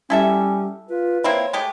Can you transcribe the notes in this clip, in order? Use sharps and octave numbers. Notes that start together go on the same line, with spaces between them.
G3 C#4 E4 A4 E5
F4 B4
A#3 C4 E4 C#5
G#3 A3 G4